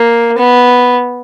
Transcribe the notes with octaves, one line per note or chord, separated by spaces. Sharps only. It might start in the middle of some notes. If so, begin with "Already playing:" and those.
Already playing: A#3
B3